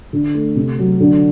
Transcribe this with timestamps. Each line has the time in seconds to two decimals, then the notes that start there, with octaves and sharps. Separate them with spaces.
0.13 D3
0.35 A3
0.56 C3
0.79 F#3
1.00 D3